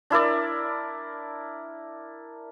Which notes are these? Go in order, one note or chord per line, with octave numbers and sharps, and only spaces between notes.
D4 E4 A#4 D5